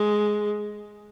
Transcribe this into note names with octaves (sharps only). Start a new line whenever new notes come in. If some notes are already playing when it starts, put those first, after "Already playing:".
Already playing: G#3